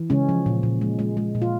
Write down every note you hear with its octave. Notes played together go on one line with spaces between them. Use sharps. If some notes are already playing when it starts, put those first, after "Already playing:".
Already playing: E3
C#3 G#3 C#4
F3
A#2
A#2
G#3
G#3
G#3
A#2
F4